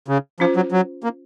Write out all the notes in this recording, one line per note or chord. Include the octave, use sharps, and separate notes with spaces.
C#3
F3 C#4 F4 C5
F#3
F#3
A#3